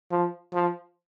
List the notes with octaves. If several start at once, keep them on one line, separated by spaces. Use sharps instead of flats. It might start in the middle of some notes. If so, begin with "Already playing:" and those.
F3
F3